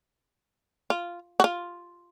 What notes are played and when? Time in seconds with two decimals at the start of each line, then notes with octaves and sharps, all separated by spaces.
0.90 F4
1.40 F#4
1.44 F4